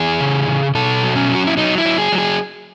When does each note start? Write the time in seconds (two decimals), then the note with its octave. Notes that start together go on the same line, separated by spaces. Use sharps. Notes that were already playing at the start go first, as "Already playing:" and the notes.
Already playing: E3 G#4
0.20 C#3
0.48 C#3
0.75 B2 A4
1.03 F#3
1.16 C#4
1.29 F#3
1.35 F#4
1.47 E4
1.57 F#3 D#4
1.78 E4
1.85 F#3
1.98 G#4
2.12 F#3
2.18 G#4